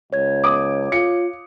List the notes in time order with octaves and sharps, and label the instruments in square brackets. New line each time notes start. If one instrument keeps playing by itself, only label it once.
[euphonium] C#2 [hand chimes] C#5 G#6
[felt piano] D6 D#6
[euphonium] F4 [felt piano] C#7